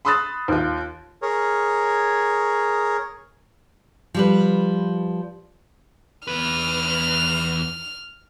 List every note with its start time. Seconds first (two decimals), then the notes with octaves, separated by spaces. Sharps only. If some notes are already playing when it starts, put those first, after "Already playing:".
0.05 B5 C6 D#6 E6 F#6 A6
0.48 D#2 F4
1.22 G#4 A#4 C#5
4.14 F3 G3 B4
6.28 E2 B4 F6